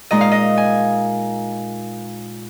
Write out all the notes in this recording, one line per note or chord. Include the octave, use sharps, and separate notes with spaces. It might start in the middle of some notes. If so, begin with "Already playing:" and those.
A#2 G#3 D#4 D#5
F5
D#5
G#5